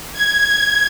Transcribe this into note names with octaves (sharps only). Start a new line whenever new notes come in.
G#6